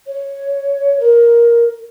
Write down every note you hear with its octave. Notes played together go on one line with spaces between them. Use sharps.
C#5
A#4